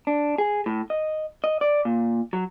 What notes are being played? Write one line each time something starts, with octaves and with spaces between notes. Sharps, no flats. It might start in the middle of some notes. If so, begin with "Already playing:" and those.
D4
G#4
A2
D#5
D#5
D5
A#2
F#3